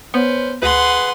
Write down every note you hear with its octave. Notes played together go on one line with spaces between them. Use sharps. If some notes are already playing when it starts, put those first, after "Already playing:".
B3 C#4 B4 C5
D2 G#4 B4 F#5 C6